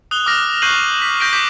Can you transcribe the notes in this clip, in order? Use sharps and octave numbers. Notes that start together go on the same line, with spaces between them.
D#6 F#6 F7 G7
D6 F6 A#6
C#6 F#6 G6 C7 D#7 F#7
B6
G6 A#6 B6 D7 G7
D6 G6 A#6 B6